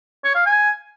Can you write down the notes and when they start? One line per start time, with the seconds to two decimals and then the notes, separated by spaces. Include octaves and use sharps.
0.24 C#5
0.35 F5
0.46 G#5